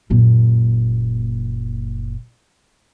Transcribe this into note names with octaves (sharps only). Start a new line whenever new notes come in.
F#1 A#2